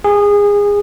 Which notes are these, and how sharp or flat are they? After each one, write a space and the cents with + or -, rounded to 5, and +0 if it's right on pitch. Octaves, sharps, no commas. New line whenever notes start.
G#4 -25